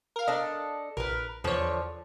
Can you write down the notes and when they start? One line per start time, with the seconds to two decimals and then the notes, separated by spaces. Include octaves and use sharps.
0.16 A#4 F5
0.27 D4 A4 D#5
0.97 A#1 A#4 B4
1.44 E2 D3 F3 C#5